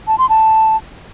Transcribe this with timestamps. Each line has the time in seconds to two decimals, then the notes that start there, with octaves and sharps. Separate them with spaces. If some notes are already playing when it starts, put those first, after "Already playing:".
0.07 A5
0.18 C6
0.29 A5